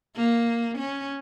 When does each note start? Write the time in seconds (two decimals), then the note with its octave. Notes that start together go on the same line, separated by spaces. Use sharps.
0.16 A#3
0.78 C#4